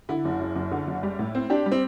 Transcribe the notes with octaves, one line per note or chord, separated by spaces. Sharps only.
D3 E4
F#1
F#2
F#1
D3
F#1
G3
A2
C4
D4 G4
G3
C4